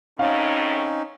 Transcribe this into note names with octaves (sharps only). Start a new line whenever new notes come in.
F#2 A2 C4 C#4 D#4 F5